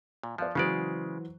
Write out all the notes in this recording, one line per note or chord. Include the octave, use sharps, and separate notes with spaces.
A#2
F3 D5 F5 F#6
C#3 E3 F#3 G#3 C5 D5